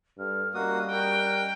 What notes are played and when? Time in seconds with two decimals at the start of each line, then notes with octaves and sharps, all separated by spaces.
0.18 G2 A4 F6
0.54 G3 A#3 C#4 F#4 D#5 D#6 F#6
0.91 A#4 G5